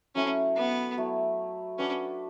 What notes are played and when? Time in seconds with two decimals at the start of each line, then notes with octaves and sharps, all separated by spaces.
0.15 F#3 A3 C#4 E4
0.56 B3
0.98 F#3 A3 E4
1.79 C#4 D4 F#4 B4